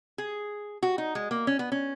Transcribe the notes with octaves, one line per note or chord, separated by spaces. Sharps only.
G#4
F#4
D#4
G#3
A#3
C#4
B3
C#4